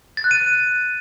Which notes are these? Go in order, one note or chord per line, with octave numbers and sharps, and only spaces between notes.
A6
F#6
D#7